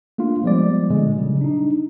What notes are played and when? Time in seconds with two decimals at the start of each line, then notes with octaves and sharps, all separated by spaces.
0.18 A3 A#3 D4 F4
0.44 F3 G3 G#3 B3 D5
0.90 A#2 D3 G#3
1.15 C#3 F#3 G3
1.41 D4 D#4